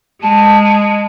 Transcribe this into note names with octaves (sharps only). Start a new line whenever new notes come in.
G#3 A5